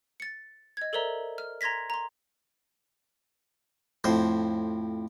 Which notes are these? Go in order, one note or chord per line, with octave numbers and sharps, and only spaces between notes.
A6 C#7
D#5 G#6
A4 A#4 C5 D5 E5 A#5
F6
A#5 C6 G#6 A#6 B6
A#5 C6
F2 A2 C5